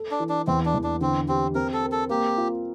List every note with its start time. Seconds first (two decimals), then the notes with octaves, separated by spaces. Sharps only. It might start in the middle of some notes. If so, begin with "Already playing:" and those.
Already playing: A4
0.11 D4
0.20 E3
0.29 D4
0.47 E2 C4
0.65 D4
0.75 E2
0.84 D4
1.01 D3 C4
1.28 C4 G4
1.55 C4 A#4
1.73 A4
1.82 A#4
1.92 A4
2.10 A#3 G4
2.37 F4